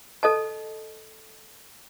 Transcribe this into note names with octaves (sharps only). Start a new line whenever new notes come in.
A4 D#5 A5